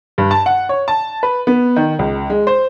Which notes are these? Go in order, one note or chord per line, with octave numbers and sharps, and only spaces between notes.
G2
A5
F#5
C#5
A5
B4
B3
D#3
C#2
G#3
C5